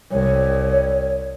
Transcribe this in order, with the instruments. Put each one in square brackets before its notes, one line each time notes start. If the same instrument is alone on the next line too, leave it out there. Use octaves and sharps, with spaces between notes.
[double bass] C2 [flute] C#5